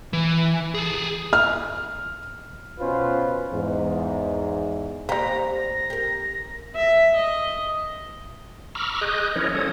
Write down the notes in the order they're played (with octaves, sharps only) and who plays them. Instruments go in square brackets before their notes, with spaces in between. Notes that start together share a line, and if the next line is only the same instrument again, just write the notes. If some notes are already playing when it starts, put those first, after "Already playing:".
[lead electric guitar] E3
G#4 A4
[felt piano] F6
[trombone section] B2 C#4 F4 B4 C5
E2 G#2
[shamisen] G3 A#3 [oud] C4 G4 [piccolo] A#5
[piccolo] A#6
[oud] G4 A#4
[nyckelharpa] E5
D#5
[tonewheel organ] A#5 B5 C#6 D6 E6 F6
G#4 D#5 D#6 F#6 G6
F3 C#4 E4 A#4 C#5 D#5
F3 G3 C#4 A4 C#5 D#6